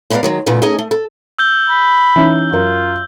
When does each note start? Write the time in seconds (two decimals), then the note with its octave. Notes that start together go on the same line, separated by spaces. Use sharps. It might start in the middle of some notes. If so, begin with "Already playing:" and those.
0.10 G#3 B3 A#4 C5 D5 F5
0.23 D#3 F#3 G#3
0.46 A#2 C#3 E3 A3 B3
0.62 A3 C#4 D#4 G#4 D#5 G#5
0.79 A3
0.91 A4
1.39 E6 G6 G7
1.70 B5
2.16 E3 C#4 D#4
2.52 F#2 F4 A#4